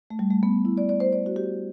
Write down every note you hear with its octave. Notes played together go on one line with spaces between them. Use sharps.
A3
G3
A3
B3
E4
D5
D5
C5
D5
F#4
G4